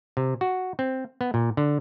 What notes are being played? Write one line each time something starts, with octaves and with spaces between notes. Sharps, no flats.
C3
F#4
C4
B3
A#2
D3